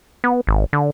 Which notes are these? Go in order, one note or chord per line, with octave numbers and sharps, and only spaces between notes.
B3
G#1
D3